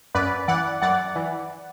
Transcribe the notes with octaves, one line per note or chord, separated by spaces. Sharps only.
F#2 B4 D5
E3 D5 F#5
F#2 D5 F#5
E3